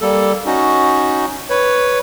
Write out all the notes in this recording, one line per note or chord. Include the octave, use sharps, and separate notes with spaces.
G3 A#3 A4
C#4 D#4 F#4
B4 C#5